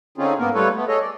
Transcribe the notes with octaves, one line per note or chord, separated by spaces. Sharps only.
D3 C4 C#4 D#4 F4 G#4
G#2 A#3 B3 A#4
G3 A3 F4 A4 B4 C#5
A3 B3
G#4 A4 C#5 D#5
D5